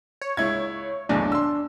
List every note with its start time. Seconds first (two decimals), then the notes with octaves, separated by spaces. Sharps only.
0.22 C#5
0.37 C#2 E4 G#6
1.09 B1 E2 A2 D4
1.32 C6 E6